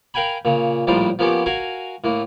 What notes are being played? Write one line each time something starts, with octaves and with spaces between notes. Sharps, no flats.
A#4 F5 G5 G#5 B5
A#2 C#3
A#1 A2 F3 G3 A#4 C5
F3 A#3 B3 C#4 G4
F#4 A#4 F5 G#5
A2 A#3